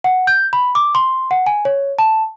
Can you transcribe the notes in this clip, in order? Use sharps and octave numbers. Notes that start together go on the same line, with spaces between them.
F#5
G6
B5
D6
C6
F#5
G#5
C#5
A5